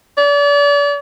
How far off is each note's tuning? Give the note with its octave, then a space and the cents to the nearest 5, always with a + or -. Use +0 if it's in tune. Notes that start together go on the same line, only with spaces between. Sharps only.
D5 -40